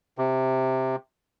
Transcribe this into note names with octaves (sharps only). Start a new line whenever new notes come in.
C3